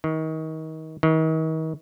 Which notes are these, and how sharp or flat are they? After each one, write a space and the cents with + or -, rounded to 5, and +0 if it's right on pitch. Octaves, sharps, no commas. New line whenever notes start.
D#3 +30
D#3 +40